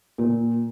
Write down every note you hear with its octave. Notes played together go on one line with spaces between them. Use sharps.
A#2